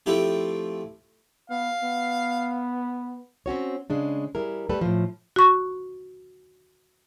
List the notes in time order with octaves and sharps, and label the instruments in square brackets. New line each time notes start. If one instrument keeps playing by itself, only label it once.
[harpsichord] F3 A3 C4 E4 G4
[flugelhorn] B3 [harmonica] F5
[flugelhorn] B3
[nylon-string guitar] C4 C#4 F#4 C#5
C#3 G#3 D4
G3 E4 G#4 A#4
G3 A3 A4 B4
A2 F3
[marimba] F#4 C#6